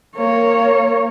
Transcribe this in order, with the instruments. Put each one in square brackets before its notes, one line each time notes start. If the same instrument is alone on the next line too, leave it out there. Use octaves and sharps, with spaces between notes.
[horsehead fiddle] A#3 C#5